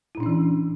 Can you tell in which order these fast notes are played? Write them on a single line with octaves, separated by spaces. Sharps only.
E4 A#2 D4 C#4 E3